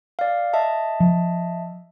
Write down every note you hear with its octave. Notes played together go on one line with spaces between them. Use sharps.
D5 F5
D#5 E5 A5
F3